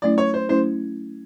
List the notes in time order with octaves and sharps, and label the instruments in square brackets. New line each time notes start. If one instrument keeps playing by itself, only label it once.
[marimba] F#3 A3 C#4 E4 [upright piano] D5
[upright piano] C#5
C5
[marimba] F#3 A3 C#4 E4 [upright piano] C5